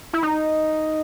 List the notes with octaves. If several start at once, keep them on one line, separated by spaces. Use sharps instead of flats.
E4
D#4